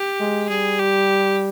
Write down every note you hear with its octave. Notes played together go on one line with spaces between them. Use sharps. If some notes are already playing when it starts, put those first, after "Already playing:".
Already playing: G4
G#3
G3 G#4
G4